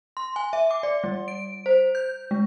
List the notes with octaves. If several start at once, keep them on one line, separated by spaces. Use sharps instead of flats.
C6
G#5
E5
D6
D5
G3
D7
C5
G6
G#3